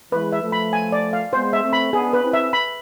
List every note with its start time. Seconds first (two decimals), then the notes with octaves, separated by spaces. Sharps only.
0.12 E3 G#3 B4
0.32 E5
0.42 F3 A3
0.52 B5
0.73 G#5
0.92 D5
1.13 F5
1.32 G#3 B3 C5
1.53 E5
1.63 A3 C4
1.73 B5
1.93 B3 D4 G#4
2.13 B4
2.23 C4 E4
2.33 E5
2.53 B5